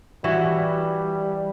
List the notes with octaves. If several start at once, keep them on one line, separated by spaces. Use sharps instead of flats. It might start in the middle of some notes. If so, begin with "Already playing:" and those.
E3 G3 E4 F#4